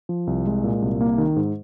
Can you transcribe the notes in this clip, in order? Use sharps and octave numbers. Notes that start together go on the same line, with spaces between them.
F3
C2
G#3
A#2
C2
A#3
D#3
G#2